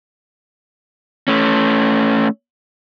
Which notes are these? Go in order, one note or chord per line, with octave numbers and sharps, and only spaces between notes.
A3 C#4